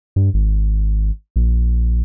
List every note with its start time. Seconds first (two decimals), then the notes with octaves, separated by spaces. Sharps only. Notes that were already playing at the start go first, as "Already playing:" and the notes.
0.16 G2
0.34 G#1
1.36 A#1